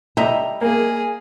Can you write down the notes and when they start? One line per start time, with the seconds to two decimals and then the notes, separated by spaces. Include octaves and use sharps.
0.17 G3 D#5 E5 A#5
0.61 A#3 G#4